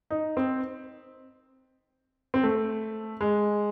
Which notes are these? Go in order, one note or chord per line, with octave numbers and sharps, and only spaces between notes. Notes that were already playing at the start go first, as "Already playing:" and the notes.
D#4
C4
C4
A3
G#3